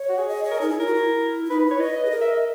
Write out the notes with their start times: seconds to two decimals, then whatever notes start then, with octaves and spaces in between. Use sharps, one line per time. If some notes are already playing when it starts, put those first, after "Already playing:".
Already playing: C#5
0.09 F#4
0.19 G#4
0.28 D#5
0.44 C#5
0.51 A#4
0.59 D#4 G#4
0.69 E4 G#4
0.80 E4 A#4
0.87 F#4
0.94 E4
1.45 E4
1.50 D#4 B4
1.60 B4
1.66 E4
1.71 C#5
1.80 B4 D#5
1.96 D#5
2.05 G#4
2.11 A#4 D#5
2.21 E5
2.31 D#5